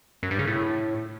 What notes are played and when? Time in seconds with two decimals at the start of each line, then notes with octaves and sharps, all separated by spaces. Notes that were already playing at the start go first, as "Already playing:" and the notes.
0.23 F#2
0.31 G2
0.39 C#3
0.47 A2